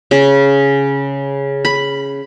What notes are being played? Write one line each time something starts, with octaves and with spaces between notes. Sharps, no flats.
C#3
B5